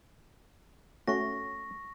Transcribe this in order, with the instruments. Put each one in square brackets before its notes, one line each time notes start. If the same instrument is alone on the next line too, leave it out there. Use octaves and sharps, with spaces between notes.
[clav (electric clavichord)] A3 C#4 F#4 [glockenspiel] C#6 A#6